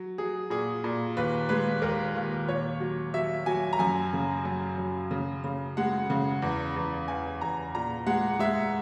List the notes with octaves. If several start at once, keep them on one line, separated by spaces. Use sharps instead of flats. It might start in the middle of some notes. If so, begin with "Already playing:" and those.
Already playing: F#3
F#3 G#4
A#2 G#4
A#2
D#2 B4
G#3 B4
D#2 A#4
D#2
A#2 C#5
F#3
F#3 E5
F#3 G#5
A#5
F#2 G#5
C#3
F#2
F#2
C#3
C#3
G#3 F#5
C#3
E2
E2
E2 G#5
E2 A#5
A#2 A#5
G#3 F#5
G#3 E5